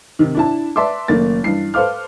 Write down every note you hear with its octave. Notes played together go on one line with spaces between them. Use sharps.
C3 D#3
D4 E4 A5
B4 D5 E5 A5 C6 D6
F#1 D#3 A3 A#3 A6
G2 E3 C7
A4 B4 C5 F5 D6 F6